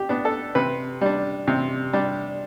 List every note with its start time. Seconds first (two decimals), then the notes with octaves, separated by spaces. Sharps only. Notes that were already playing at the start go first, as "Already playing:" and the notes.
Already playing: G4
0.09 B3 D4
0.25 A4
0.55 C3 B4
1.01 G3 D4
1.47 C3
1.93 G3 D4